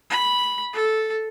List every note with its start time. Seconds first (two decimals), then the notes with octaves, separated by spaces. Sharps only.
0.10 B5
0.73 A4